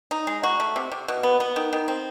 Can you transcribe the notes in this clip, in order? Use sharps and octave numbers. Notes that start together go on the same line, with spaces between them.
D#4
G#3
F#4
A3
C3
C3
B2
B3
B3
D#3
D#3
C4